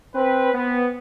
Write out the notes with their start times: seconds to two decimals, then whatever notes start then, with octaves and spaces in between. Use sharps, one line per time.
0.14 C4 B4
0.54 B3